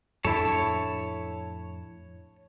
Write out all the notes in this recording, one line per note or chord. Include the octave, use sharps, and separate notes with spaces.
F2 A2 D4 E4 A4 C#5 A5